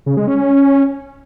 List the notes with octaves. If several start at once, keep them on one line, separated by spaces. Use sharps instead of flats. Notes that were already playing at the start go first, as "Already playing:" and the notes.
C#3
G#3
C#4